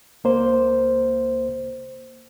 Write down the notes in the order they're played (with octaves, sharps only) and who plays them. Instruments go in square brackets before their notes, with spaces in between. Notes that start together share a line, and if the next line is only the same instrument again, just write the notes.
[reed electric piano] C#2 A#3 C5